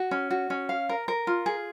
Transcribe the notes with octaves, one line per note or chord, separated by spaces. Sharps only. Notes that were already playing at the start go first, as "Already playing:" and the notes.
Already playing: F#4
C#4
F#4
C#4
F5
A#4
A#4
F4
G#4